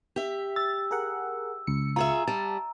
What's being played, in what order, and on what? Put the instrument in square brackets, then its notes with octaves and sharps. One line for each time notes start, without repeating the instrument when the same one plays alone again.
[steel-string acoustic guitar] G4 E5
[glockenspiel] E6 [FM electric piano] A6
[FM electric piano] G#4 A#4 F#5
C#2 C#7
[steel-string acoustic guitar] F4 G#4 E5 [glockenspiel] A#5
[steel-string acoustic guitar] G3 [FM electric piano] A5